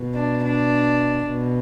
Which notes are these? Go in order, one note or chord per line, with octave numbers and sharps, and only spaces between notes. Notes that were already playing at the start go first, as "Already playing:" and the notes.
Already playing: B2
D4
D4
B2